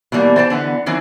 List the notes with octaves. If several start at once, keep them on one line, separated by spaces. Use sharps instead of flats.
B2 E3 G3 A#3
E3 C5 G5 A5
D3 E3 B3
D#3 E3 F#3 C4